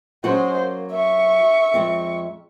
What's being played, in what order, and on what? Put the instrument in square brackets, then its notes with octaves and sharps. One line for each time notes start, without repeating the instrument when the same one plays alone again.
[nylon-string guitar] F#3 C#4 F#4 [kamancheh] G#3 C5
[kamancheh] A#3
E5 C#6
[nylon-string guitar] F2 G#3 C4